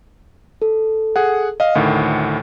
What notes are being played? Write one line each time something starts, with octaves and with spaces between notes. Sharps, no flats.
A4
G#4 F#5
D#5 F5
D2 A2 D#3 F#5